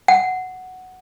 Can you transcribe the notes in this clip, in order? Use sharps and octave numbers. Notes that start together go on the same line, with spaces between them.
F#5